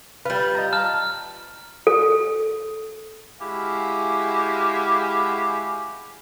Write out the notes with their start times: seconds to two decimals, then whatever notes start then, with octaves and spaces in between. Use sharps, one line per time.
0.25 G3 F4 B4
0.55 D#5 A#5
0.73 A5 A#5 F6
1.87 A4
3.41 G#3 E4 F#4 G4 F5 G#5